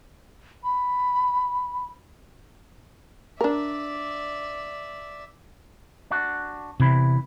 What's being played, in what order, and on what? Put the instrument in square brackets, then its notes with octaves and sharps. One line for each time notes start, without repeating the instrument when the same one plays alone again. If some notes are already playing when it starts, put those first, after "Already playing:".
[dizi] B5
[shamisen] D4 A#4 [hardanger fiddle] D5 E5
[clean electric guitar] D4 F#4
[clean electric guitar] E2 E4 B5 [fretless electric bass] C3